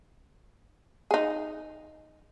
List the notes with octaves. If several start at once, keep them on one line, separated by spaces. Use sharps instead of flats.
D#4 G#4